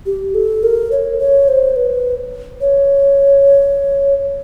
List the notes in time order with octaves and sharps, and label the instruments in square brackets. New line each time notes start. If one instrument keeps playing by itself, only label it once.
[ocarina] G4
A4
A#4
C#5
C#5
C5
B4
C#5